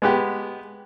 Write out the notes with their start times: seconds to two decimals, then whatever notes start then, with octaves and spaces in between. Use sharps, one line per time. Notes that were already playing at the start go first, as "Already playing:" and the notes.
0.02 G#3 B3 G4